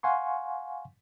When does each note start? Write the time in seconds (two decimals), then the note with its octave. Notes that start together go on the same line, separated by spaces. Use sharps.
0.03 F5 F#5 G#5 C6 C#6